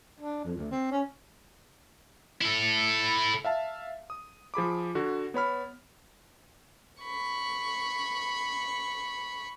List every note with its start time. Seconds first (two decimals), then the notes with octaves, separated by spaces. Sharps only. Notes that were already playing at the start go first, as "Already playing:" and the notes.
0.20 D4
0.45 F2
0.58 D2
0.71 C4
0.92 C#4
2.41 E4 A4
3.45 E5 F5 A5
4.10 D#6
4.54 F3 G#4 B5 D6
4.95 D3 F#4
5.34 B3 C#5 B5 F6
7.02 B5 C#6